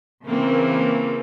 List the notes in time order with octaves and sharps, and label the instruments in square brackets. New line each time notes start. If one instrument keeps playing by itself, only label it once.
[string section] C#3 E3 A#3 C4